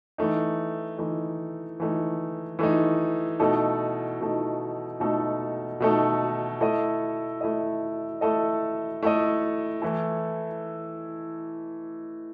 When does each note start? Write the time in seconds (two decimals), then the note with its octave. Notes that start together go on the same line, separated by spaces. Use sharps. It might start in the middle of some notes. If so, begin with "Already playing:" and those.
0.18 E3 A3 D#4
0.98 E3 A3 D#4
1.80 E3 A3 D#4
2.59 E3 A3 D#4
3.40 B2 A3 D#4 A4
4.21 B2 A3 D#4 A4
5.00 B2 A3 D#4 A4
5.80 B2 A3 D#4 A4
6.61 A3 E4 A4 D#5
7.41 A3 E4 A4 D#5
8.21 A3 E4 A4 D#5
9.03 A3 E4 A4 D#5
9.82 E3 A3 E4 A4